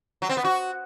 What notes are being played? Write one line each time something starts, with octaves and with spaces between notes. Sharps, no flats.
F#3
C4
B3
F#4